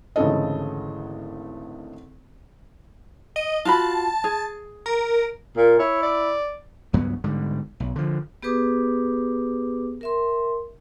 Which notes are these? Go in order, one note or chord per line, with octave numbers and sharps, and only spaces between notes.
G#1 D2 C#3 E3 A4 D#5
D#5
F4 F#4 A5 B5
G#4
A#4
A#2
E4 C#5
D5
C#2 G2 F#3 B3
G#2 D3 G3
B1
D3 F3
B3 G4 G#4 B4 D6 D#6
A#4 E5 C6